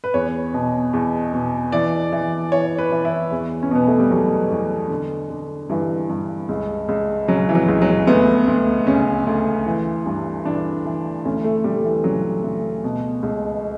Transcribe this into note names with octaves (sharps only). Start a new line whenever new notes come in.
B4
E2 C#5
B2
E2
B2
E3 D5
E3
E3 C#5
B4
E3
E4
E2
C#4
B2 B3
A3
G3
E2 F#3
E2
D3
D3
G2 E3
G2
C#2
C#2
C#3 F#3
E3
F#3
C#2
F#3
D2 B3
D2
C#3 C#4
D2
E3
G2
E3 D4
E3
D2 C#4
A3
D2 G3
E3
C#3 F#3
D2
B2
C#2